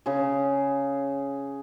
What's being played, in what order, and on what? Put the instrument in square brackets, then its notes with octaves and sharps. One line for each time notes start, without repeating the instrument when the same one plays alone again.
[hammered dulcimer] C#3 G#4